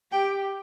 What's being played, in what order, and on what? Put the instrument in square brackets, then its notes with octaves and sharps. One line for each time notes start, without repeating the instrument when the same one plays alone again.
[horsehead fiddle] G4 [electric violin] G5